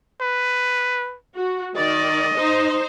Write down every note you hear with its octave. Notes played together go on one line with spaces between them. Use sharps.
B4
F#4
D#3 D5 D#5
D#4 C5